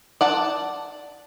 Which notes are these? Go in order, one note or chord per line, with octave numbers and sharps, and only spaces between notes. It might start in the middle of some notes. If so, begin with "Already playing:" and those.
D5 F#5 A5